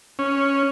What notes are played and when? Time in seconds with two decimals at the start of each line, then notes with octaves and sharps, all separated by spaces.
0.19 C#4